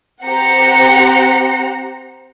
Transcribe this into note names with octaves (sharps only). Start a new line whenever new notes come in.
C4 G4 C5 F#5 A#5 C#7